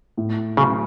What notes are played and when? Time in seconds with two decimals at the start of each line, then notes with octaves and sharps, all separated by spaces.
0.17 A2
0.57 C#3 F#3 B3